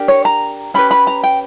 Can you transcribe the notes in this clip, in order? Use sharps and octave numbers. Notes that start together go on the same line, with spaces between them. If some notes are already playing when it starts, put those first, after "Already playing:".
Already playing: D4 G4 A#4
C#5
A#5
C#4 G4 B4 B5
B5
A#5
G5